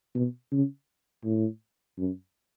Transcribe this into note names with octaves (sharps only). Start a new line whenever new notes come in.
B2
C#3
A2
F#2